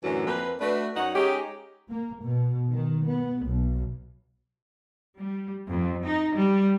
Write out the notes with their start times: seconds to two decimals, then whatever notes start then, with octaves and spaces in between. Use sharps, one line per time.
0.04 F#2 A2 D3 E3 F#3
0.27 F2 A#3 B4
0.61 A3 D4 F#4 B4
0.97 F#2 D#4 C#5 F#5
1.16 G#3 C#4 D#4 G4
1.89 A#3
2.23 B2
2.70 D#3
3.07 B3
3.43 B1
5.18 G3
5.67 F2
6.05 D#4
6.34 G3